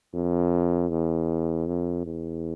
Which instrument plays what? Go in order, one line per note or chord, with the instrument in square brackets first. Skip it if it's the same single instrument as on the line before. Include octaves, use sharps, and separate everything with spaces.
[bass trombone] F2
E2
F2
E2